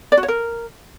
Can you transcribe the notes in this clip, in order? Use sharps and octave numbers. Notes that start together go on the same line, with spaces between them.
D5
F#4
C#5
A#4